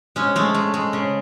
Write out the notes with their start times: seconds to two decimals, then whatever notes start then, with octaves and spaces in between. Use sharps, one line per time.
0.16 G#3 C#4
0.36 G#3 A3
0.54 G#3
0.74 G#3
0.93 C#3